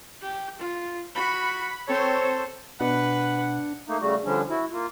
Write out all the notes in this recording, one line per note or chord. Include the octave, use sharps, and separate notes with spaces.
G4
F4
F#4 B5
C4 A4 C5 C#5
B2 D4 B4 F#5
A3 A#3 D#4
C#3 G3 A3 F#4
D3 F3 G3 C#4 D4
E4 F#4
A#3 F4